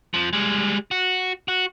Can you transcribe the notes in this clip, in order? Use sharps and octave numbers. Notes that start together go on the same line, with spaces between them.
F2 F3
G3 G#3
F#4
F#4